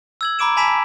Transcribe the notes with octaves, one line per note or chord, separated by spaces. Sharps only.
E6 G#6 F#7
A#5 B5 D6 D7 E7
G#5 A5 B5 B6 D7 E7